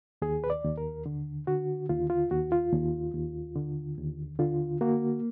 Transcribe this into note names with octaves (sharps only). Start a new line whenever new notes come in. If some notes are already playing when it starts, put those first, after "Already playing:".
D#2 G#4
B4
D5
D#2
A#4
D3
D3 F#4
D#2 F4
F4
D#2 F#4
F4
D#2
D#2
D3
D#2
D3 F4
A#3 F#4